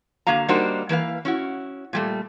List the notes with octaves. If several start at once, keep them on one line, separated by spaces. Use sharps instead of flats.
D3 A#3 F#4 F5 A#5
G3 A#3 D4 D#4 F#4 C5
E3 A#3 B4 F5
C#4 E4 F#4
A#2 G3 A3